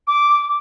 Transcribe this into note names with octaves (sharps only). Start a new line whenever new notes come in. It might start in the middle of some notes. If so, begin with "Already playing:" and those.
D6